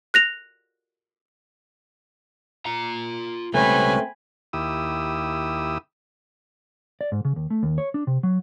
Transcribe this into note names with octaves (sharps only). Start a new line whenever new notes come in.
F#6 A#6 F7
F4 A#5
C#2 G3 A3 C4 C#4 B4 G#5 B5
D#2 E4 G4 D#6 E6
D5
G#2
C#3
D#2
A3
D#2
C#5
D4
C3
F#3